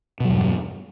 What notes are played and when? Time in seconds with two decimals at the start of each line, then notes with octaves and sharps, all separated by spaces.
0.20 B2
0.25 F#3
0.29 E2
0.33 G2